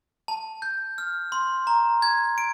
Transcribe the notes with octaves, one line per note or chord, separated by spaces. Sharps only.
A5
G6
F6
C6
A#5
G#6
D7